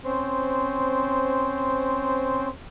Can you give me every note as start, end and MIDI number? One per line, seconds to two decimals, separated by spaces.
0.05 2.48 60
0.05 2.48 61
0.05 2.48 72